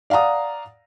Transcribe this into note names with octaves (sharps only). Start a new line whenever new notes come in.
D5 F5 F#5 A#5 D#6